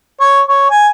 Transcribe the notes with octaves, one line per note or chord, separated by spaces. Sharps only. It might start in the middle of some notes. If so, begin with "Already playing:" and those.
C#5
C#5
G#5